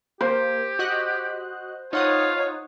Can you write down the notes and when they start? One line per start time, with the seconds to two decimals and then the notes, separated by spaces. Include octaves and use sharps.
0.21 A#3 G4 C5
0.79 F#4 D#5 F#6
1.93 D#4 F4 C#5 F#5 D#6